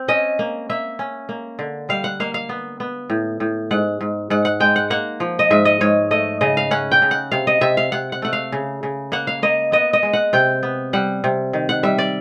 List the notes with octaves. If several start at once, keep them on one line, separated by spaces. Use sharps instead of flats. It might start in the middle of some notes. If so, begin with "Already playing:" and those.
Already playing: C4
C#4 D#5
A#3
A#3 E5
C#4
A#3
D3
G3 F5
F#5
A#3 F5
F5
B3
B3
A2
A2
G#2 F#5
G#2
G#2 F#5
F#5
G#3 G5
F#5
A#3 F#5
F3
D#5
G#2 E5
D#5
G#2 C#5
A3 D#5
C#3 D#5
F5
C#4 F#5
G5
C#3
F#5
C3 F5
D#5
C3 E5
F5
C3 F#5
F#5
A3 F#5
F5
C#3
C#3
A#3 F#5
F5
A#3 D#5
B3 D#5
D#5
G#3
F#5
C3 G5
B3
G3 F#5
C3
D#3
F#5
G3 E5
D5